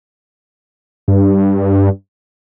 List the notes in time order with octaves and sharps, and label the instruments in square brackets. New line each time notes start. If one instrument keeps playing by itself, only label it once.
[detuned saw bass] G2